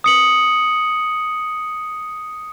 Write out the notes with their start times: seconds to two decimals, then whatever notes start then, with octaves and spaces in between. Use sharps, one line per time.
0.04 D#6 C#7 F#7